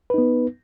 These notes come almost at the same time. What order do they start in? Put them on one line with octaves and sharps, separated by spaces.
B4 D#4 B3